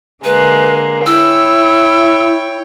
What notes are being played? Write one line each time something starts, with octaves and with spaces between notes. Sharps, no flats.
D3 G#3 A#3 B4
E4 C#5 G5 E6